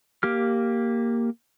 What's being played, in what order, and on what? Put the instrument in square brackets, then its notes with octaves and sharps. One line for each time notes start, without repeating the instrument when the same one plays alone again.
[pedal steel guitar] A#3 G4 F6